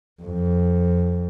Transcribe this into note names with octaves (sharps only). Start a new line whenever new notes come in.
F2